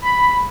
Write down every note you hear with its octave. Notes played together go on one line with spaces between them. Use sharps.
B5